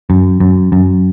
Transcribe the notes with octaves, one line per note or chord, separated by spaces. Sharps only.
F#2
F#2
F#2